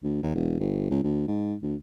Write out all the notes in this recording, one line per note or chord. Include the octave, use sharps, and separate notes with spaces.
D2
D#2
E1
G1
C#2
D2
G#2
D2